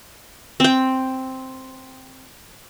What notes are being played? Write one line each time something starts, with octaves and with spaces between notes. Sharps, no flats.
C4 G5